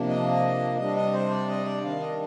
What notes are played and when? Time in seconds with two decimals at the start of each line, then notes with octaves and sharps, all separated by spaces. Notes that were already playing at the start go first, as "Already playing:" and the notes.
Already playing: C3 F3 A#3 D4
0.08 D#5
0.77 C3 G3 D4 D#5
0.96 D#5
1.13 C5
1.30 D5
1.48 D#5
1.65 D5
1.83 D#3 G3 D4 F5
2.00 D#5